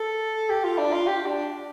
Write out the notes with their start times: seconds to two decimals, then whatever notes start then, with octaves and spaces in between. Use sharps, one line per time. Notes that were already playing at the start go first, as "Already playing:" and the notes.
Already playing: A4
0.49 G4
0.64 F4
0.78 D4
0.92 F4
1.07 G4
1.26 D4